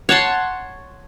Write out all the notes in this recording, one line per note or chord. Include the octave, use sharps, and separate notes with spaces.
C#5 F#5 A5 C6